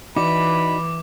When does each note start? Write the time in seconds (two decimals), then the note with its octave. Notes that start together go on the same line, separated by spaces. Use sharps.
0.16 E3 D#4 F#4 D5 B5 D6